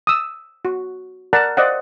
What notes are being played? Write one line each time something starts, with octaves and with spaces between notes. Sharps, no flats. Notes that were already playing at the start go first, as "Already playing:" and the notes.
D#6 E6
F#4
A#4 D5 F#5 A5 A#5
C5 D5 D#5 F5 F#5